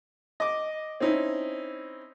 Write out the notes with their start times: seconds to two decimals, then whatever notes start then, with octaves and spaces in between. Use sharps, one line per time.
0.40 D#5 D6
1.00 C4 C#4 D#4 E4